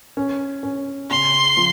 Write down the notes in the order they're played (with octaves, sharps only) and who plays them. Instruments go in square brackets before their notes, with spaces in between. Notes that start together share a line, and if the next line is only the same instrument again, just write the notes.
[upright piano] C#4
C#4
[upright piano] C#3 [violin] C6
[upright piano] F3